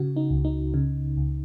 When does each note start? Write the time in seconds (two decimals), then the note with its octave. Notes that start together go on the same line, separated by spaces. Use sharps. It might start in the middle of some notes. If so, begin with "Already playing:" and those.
Already playing: C#3 F#4
0.16 D#4
0.30 C#2
0.45 D#4
0.74 C#3
1.17 C#2